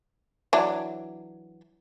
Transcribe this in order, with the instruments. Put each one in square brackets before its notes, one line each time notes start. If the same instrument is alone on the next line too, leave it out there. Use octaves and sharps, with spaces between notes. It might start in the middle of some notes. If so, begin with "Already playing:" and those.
[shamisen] E3 F#3 D4